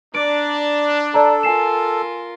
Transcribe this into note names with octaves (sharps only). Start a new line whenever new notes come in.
D4 D5 A#5 D7
A4 D5 A5 A#5
F4 A#4 G#5 C7 E7